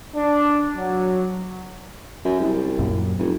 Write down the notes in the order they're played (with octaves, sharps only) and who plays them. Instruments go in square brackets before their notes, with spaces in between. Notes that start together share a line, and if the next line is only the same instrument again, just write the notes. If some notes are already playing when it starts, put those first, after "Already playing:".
[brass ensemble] D4
F#3
[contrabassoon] F#2
C2
[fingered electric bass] F#2 A#2
[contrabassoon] F1